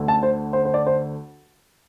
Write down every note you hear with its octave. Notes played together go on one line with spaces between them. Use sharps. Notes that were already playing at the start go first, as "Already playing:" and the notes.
Already playing: D2 D3 A3
A5
C5
C5
C5
D5
C5